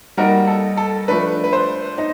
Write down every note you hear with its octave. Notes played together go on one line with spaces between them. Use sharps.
G3 A#3 D#4 F#4 A#4
A4
A4
F3 A3 D4 B4
B4
C5
D#4